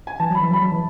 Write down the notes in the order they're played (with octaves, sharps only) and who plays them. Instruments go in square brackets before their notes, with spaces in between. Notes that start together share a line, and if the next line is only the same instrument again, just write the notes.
[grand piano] G#5
[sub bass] E3 [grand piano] A5
[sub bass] F#3
[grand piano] B5
[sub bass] E3
[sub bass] F#3 [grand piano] B5
[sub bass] F#3
E3